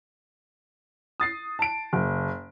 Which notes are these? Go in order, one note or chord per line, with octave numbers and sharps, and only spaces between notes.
D#6 A6 C7
A5 D7
F#1